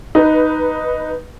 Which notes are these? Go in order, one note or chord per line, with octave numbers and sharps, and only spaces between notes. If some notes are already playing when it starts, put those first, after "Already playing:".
D#4 B4